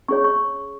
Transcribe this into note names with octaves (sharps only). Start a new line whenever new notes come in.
C#4 G#4 C#5 C#6
C#6